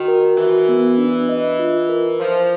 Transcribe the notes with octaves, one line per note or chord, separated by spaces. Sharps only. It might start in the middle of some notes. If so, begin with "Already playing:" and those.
Already playing: D#3 F#4
A#4
E3 F#4
B3
D4
D#5
F4
A#4
F3 C5